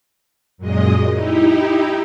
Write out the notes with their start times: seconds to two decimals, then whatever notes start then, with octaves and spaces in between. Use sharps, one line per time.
0.58 F#2 A#2 G#3 D#5
1.12 D#4 E4 G4